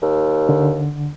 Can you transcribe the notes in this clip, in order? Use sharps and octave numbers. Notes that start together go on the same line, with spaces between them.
D#2
D3